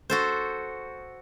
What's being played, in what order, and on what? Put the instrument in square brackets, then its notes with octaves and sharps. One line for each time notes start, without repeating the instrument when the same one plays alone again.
[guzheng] F#4 A4 C5